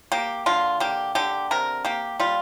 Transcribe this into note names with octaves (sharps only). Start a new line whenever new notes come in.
A#3 G4
D3 F4
A#3 G4
D3 G4
C3 A#4
A#3 G4
G3 F4